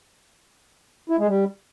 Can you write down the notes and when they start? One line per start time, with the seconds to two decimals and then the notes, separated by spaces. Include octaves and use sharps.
1.10 E4
1.19 G#3
1.28 G3